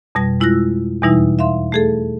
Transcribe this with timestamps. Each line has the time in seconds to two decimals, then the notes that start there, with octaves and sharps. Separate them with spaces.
0.15 F2 B2 G3 A#6
0.40 G#3 E4 F4 E6 F#6 A#6
1.02 E2 B2 E3 G3 D#4 E4
1.39 E5 F5 C6
1.72 A3 G#4 A4